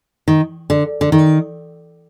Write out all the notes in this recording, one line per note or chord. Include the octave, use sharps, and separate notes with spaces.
D#3
D3
D3
D#3